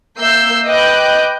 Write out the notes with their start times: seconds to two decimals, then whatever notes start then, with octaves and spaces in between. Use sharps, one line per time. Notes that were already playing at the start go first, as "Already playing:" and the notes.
0.18 A#3 E5 E6 G6 C7
0.66 B4 D#5 G5 D6 F#6 G6